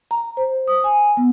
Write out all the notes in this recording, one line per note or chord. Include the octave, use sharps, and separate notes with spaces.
A#5
C5
D#6
G#5
B3